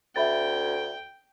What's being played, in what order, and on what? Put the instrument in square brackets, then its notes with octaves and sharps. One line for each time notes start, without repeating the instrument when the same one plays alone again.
[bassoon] D2 [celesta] E5 B5 A6 [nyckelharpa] G5